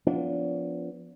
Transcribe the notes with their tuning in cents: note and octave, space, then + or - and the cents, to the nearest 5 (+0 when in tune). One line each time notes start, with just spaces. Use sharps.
F3 +0 B3 +0 D4 -35